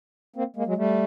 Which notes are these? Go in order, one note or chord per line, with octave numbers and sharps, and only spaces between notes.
A#3 C4
G#3 A#3
F#3 G#3
G3 A3